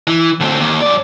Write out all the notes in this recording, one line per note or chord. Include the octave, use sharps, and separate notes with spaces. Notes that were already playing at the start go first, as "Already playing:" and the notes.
E3
D2 C4
D#2
F#2 D5